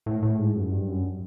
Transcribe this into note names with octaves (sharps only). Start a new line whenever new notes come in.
A2
A2
G#2
F#2
G2
F#2